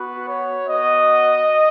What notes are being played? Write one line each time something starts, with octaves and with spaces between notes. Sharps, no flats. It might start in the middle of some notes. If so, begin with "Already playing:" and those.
Already playing: B3 F#4 B4
C#5
B3 F#4 D#5